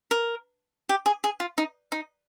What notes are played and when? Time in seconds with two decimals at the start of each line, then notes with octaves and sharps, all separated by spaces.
0.11 A#4
0.89 G4
1.06 G#4
1.24 G#4
1.40 F4
1.58 D#4
1.92 D#4